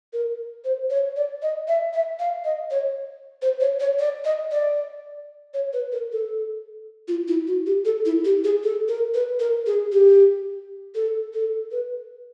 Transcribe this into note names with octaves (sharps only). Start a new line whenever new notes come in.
A#4
C5
C#5
D5
D#5
E5
E5
F5
D#5
C#5
C5
C#5
C#5
D5
D#5
D5
C#5
B4
A#4
A4
F4
E4
F#4
G4
A4
E4
G4
G#4
A4
A#4
B4
A#4
G#4
G4
A4
A4
B4